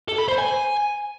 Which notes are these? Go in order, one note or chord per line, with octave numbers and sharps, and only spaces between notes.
A4
B5
C5
G#5